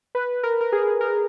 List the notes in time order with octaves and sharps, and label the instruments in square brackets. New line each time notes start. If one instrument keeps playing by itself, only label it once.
[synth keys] B4
A#4
A#4
G#4
A#4